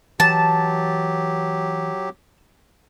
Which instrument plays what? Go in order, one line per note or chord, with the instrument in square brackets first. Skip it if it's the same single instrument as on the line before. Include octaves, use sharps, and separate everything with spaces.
[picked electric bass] E3 [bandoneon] F#3 G4 [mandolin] A5